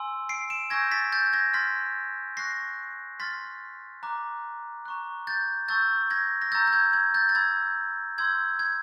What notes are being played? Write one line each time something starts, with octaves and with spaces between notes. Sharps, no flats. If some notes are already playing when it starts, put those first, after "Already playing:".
Already playing: G#5 C6 E6
C7 D7
D7 E7
G#5 C#6 E6 G6 G#6 A#6
A6 B6
G6 A6
G#6 A#6
C6 F6 A6 B6
C#6 F#6 A#6 C7
C6 F6 A6 B6
A#5 D6 F#6
A#5 C#6 F#6
G6 A6
A5 C#6 E6 G6 A6
G#6 A#6
A#6
A#5 C#6 E6 G6 A6
G6
G#6
G#6
G6 A6
A6
B5 E6 G6 G#6
C6 E6 G6 G#6
G#6